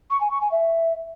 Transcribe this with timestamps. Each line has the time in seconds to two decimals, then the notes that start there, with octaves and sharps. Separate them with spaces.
0.10 C#6
0.20 G#5
0.31 C#6
0.41 G#5
0.51 E5